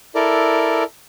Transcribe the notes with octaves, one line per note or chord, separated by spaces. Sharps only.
E4 A4 A#4 D5